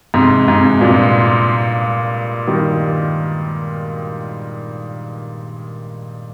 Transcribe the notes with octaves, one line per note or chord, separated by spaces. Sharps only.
G#2 C3
G#2 C3
G2 A#2
D#3 G3